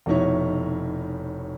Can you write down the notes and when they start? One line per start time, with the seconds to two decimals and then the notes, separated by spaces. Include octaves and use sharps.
0.06 F1 B2 D#4 E4 C#5